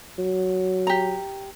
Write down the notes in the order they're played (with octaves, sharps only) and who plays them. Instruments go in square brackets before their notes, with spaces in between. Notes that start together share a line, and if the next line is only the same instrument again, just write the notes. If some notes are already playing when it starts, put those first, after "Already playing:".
[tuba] F#3
[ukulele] G4 A#5